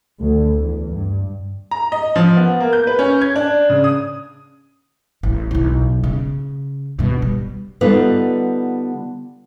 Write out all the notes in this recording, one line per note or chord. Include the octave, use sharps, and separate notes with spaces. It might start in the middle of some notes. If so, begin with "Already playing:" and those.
D2
E2
G2
A#5
D#5
F3
B3
A#3
G6
B4
C#4
G#6
D4
C#3
D#6
A1
B1 E4
C#3
G2 B2
G3
D3 G3 B3 D#4 F4 B4